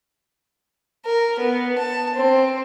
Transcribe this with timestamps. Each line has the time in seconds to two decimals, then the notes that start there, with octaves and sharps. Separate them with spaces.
1.05 A#4
1.39 B3
1.78 A5
2.16 C4